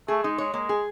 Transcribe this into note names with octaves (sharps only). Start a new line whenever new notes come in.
A3 G#4
G#3 D#4
G#3 C#5
G#3 A#3
G#4